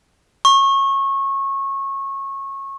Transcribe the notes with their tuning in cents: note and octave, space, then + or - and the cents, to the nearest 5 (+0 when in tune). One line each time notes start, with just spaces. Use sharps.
C#6 -25